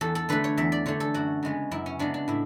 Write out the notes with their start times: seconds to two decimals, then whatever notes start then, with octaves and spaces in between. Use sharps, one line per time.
0.01 E2 A4
0.15 A4
0.29 D3 A3 B4
0.44 C#5
0.57 E2 E5
0.72 D5
0.86 D3 A3 C#5
1.00 A4
1.14 F#2 F#4
1.43 C#3 G#3 B3
1.71 F#2 E4
1.86 C#4
1.99 C#3 G#3 B3 D4
2.14 D4
2.28 A2 E4